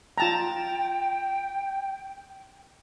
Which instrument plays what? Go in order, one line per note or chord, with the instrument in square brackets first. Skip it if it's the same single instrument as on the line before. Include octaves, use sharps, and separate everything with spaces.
[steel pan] F4 A5 A#5 [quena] G5